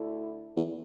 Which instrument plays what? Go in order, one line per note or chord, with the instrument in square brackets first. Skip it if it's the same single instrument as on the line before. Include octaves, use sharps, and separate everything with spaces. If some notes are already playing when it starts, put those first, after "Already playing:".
Already playing: [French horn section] D2 D3 A3 E4
[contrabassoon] E2